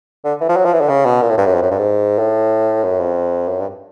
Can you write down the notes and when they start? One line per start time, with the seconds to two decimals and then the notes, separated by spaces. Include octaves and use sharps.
0.25 D3
0.41 E3
0.49 F3
0.57 F#3
0.65 F3
0.73 E3
0.81 D3
0.89 C#3
1.06 B2
1.22 A#2
1.30 A2
1.38 G2
1.46 F#2
1.54 F2
1.62 F#2
1.71 G2
1.79 G#2
2.19 A2
2.84 F#2
3.00 F2
3.48 F#2
3.60 G2